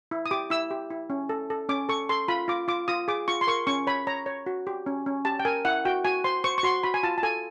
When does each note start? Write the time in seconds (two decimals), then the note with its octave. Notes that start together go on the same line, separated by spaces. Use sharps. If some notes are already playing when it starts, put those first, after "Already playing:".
0.11 E4
0.26 D#6
0.31 G4 D6
0.50 E4 E6
0.71 G4
0.90 E4
1.10 C#4
1.29 A4
1.50 A4
1.69 C#4 D6
1.89 A4 C#6
2.09 A4 C6
2.28 F4 B5
2.48 F4 D6
2.68 F4 D6
2.88 F4 D#6
3.08 G#4 D6
3.28 F4 C#6
3.41 C6
3.47 A#4 C#6
3.67 C#4 C#6
3.87 C#5 B5
4.07 C#5 A#5
4.26 C#5
4.46 F#4
4.67 G4
4.86 C#4
5.06 C#4
5.25 G4 A5
5.40 G5
5.45 A#4 G#5
5.65 E4 F#5
5.85 F#4 G5
6.05 F#4 G#5
6.24 C5 C6
6.44 C5 C#6
6.58 C#6
6.63 F#4 C6
6.83 F#4 B5
6.94 G#5
7.03 F4 A5
7.18 A5
7.23 A4 G#5